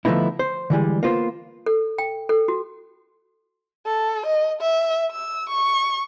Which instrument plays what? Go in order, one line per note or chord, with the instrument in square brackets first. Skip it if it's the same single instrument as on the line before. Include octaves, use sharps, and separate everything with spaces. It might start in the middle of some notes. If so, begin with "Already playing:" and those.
[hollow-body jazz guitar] D3 F3 A3 B3 D#4 E4
C5
D3 E3 G3 G#3
A#3 B3 F4 C5
[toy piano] A4
G5
A4
F#4
[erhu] A4
D#5
E5
E6
C#6